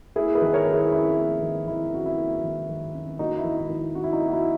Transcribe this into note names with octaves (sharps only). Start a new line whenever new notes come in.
A#3 E4 G#4
G#4 B4
D#3
A#4 C#5
D#3
E4 G#4
C#4 E4
A#3
D#3
D#3 E4
C#4 F#4
E4
A#3
D#3
D#3
C#4
A#3 D#4 F#4
E4
D#3
E4
D#3
E4
C#4 F#4
E4
D#4 F#4
A#3
F#4
E4